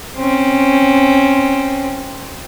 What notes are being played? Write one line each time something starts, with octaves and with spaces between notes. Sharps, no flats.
C4 C#4